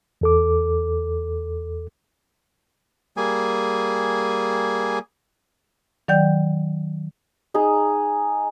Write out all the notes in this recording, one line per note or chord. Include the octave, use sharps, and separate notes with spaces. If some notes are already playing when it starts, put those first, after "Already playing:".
E2 A4 D6
G3 A#3 G#4 G#5
D#3 F#3 D5 G5 G6
D#4 G#4